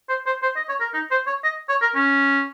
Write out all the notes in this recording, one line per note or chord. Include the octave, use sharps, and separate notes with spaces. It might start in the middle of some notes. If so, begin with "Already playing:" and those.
C5
C5
C5
D#5
C#5
A#4
D#4
C5
C#5
D#5
C#5
A#4
C#4